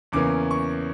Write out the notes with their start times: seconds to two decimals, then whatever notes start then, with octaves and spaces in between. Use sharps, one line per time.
0.12 E2 C#3 E3 A#3 C#4 D6
0.51 C#6